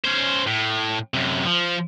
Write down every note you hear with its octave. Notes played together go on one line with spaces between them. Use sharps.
C#4 C5
A2
F#2 C3
F3